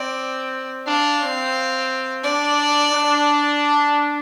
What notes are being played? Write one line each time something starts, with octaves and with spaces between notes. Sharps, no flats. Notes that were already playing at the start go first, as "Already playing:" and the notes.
Already playing: C4 D5
D4 F5
C4
D4 D5
D4